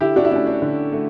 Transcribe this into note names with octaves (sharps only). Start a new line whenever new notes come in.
D3 E4 G4
D4 F#4
E4
A3 C#4 D4
D4
D3
A3